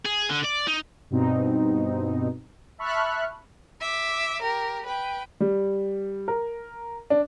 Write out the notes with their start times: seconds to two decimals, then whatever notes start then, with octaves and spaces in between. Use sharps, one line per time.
0.06 G#4
0.30 D3
0.45 D5
0.68 D#4
1.10 G2 B2 C4 D#4
2.78 E5 A5 B5 C#6 F6 F#6
3.81 E5 D6
4.42 G4 A#4
4.85 B4 G5
5.40 G3
6.28 A#4
7.10 D4